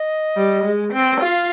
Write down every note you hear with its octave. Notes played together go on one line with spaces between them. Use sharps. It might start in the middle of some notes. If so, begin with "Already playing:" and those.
Already playing: D#5
G3
G#3
C4
F4 F5